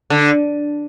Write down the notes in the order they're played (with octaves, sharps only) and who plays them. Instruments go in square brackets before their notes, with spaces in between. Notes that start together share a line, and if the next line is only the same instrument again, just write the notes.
[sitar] D3